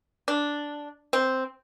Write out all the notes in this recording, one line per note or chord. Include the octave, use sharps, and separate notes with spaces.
D4
C4